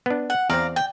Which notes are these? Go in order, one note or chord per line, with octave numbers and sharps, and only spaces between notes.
B3 D4
F#5
E2 C4 D5 F5 A#5
G5